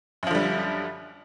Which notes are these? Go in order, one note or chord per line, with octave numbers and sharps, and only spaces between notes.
F#2 D3 F3 G3